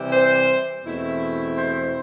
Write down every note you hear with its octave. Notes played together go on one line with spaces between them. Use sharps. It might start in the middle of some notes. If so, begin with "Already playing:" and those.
Already playing: C3 E3 G3 C4
C5
E2 B2 A3 C4 E4
C5